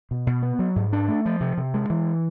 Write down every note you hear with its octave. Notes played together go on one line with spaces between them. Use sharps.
B2
B2
B3
F#3
G#2
D4
A3
F3
C3
C3
G#3
E3